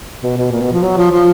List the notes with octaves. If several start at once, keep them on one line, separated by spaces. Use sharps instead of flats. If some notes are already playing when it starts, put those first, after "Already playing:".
B2
B2
A#2
B2
F3
F#3
F3
F3